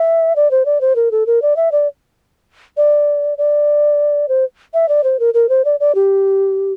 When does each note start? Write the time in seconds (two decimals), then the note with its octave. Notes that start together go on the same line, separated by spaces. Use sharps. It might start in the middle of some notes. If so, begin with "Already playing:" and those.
Already playing: E5
0.36 D5
0.51 C5
0.65 D5
0.81 C5
0.96 A#4
1.11 A4
1.26 A#4
1.42 D5
1.56 E5
1.72 D5
2.77 D5
3.38 D5
4.28 C5
4.74 E5
4.89 D5
5.04 C5
5.20 A#4
5.34 A#4
5.49 C5
5.65 D5
5.80 D5
5.95 G4